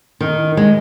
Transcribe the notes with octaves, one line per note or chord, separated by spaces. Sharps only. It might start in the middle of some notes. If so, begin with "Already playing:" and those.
D#3
G#3